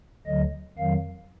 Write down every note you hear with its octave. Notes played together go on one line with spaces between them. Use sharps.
D2 D3 F#3 D#5
F2 D#3 F#3 F5